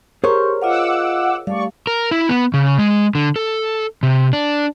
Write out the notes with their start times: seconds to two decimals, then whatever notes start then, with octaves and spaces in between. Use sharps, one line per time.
0.24 G4 G#4 A#4 C5 C#5 C6 C#6
0.62 F4 D#5 F5 F#5 D6 E6
1.47 G3 A3 D5 F5 C#6
1.87 A#4
2.11 E4
2.29 B3
2.54 C#3
2.79 G#3
3.15 D3
3.36 A4
4.03 C3
4.33 D4